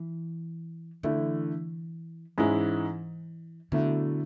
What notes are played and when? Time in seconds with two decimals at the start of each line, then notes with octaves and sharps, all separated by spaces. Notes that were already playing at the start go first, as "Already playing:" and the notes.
Already playing: E3
1.03 D3 E3 A3 E4
2.38 G#2 E3 G#3 C#4 E4
3.72 B2 D3 F#3 A3 E4